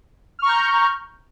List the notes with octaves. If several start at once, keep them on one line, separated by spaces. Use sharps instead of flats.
A#5 C#6 F6 G6